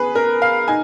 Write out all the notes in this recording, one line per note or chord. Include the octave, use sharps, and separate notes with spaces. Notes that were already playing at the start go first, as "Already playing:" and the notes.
Already playing: B3 G#4 B4
A#4
F5
D#4 G#5